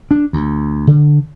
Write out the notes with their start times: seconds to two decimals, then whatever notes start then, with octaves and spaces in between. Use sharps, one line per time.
0.11 D4
0.33 D2
0.87 D3